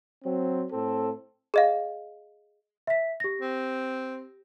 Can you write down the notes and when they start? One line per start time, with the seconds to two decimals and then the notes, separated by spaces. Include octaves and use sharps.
0.24 F#3 C4
0.72 A2 C4 A4
1.54 G#4 D#5 F5
2.87 E5 B6
3.20 G4 A#6
3.41 C4